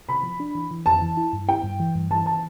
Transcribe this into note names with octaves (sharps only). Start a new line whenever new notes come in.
C3 B5
F3
D4
E3
E3
F2 A5
E3
E4
G2
E4 G5
G2
E3
G2
E3 A5
A5